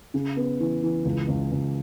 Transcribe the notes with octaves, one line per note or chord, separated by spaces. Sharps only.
C#3
B3
E3
E3
C#2
C#2
C#2